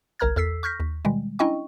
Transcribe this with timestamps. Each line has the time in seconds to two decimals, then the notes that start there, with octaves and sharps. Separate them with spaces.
0.19 G1 C2 A#4 A#5 F6 G#6
0.36 E2 A4 E6 B6 C7
0.63 C#6 F6 G6 A#6 B6
0.80 D#2
1.05 B2 D#3 G3 G#3
1.39 C#4 D4 E4 D#5 G5 C#6